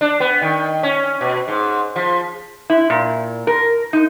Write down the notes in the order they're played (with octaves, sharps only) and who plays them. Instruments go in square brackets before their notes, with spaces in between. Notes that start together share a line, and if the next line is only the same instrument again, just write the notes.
[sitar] D4
B3
D#3
C#4
B2
G#2
F3
[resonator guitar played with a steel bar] E4
A#2
A#4
D#4